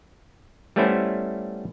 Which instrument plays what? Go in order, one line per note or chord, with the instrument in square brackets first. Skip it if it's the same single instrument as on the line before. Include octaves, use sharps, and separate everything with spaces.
[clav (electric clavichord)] G3 A3 B3 C#4 E4 C5